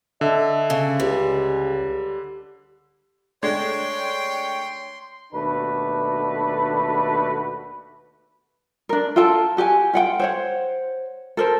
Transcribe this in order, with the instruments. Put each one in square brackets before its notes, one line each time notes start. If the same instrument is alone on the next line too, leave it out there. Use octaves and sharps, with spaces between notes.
[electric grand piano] D3 [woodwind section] A4 D#5 E5
[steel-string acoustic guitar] C#3
[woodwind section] C#2 [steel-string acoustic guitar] G3
[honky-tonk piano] G#3 A3 D4 [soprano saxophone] C#5 [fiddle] G5 [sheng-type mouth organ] C6
[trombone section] D#2 B2 A3 D4 F#4 B4
[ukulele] D4 A#4
F4 A4 G5 A5
F#4 G4 G5 G#5
F4 F#5 G5
C5 C#5 F#5
A4 A#4 C5